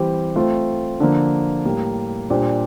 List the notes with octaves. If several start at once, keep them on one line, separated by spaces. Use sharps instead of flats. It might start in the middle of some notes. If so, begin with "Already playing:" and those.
Already playing: E3 G3 C4 G4
A3 C4 F4
D3 F3 A#3
A2 G3 A#3
A#2 G3 D4 G4 C5